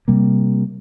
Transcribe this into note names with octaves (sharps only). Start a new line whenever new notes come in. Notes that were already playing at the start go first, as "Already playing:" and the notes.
C3 G3 A#3